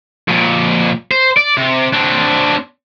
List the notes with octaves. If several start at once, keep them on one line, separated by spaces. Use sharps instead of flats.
F2 A#2
C5
D5
C3
C4 D4